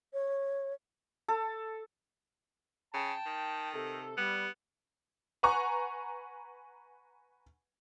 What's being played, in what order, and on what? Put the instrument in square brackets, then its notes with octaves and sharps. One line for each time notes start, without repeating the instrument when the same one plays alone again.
[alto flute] C#5
[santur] A4
[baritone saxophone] C#3 [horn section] G5 A5
[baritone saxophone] D#3
[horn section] C3 A4
[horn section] G3 [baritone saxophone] B3
[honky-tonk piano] B4 F#5 G#5 A#5 C#6 F#6